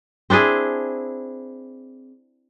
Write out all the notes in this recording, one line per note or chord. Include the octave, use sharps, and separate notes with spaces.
C4 D4 E4 G#4